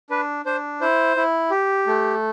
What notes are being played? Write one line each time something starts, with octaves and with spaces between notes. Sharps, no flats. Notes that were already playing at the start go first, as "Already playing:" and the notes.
D4 B4
D4 C5
E4 C5
E4
G4
A3